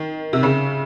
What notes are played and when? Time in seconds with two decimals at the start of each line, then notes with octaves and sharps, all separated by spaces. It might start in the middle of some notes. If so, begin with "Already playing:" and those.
Already playing: D#3
0.33 C3
0.43 C#3